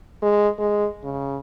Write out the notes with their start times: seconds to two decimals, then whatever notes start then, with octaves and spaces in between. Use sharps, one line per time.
0.22 G#3
0.59 G#3
1.04 C#3